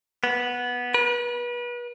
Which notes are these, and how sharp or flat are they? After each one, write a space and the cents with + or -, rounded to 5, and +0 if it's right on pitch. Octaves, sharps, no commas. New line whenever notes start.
B3 -10
B4 -35